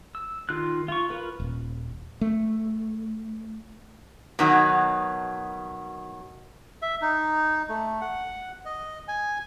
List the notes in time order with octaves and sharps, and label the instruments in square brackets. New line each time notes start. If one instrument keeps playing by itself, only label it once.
[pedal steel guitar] E6
D#3 F4 F6 F#6
F4 C#6
F4 A#4 B4
[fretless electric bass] D#1
A3
[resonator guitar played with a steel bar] B2 D#3 F#3
[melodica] E5
D#4
A3
F#5
D#5
G#5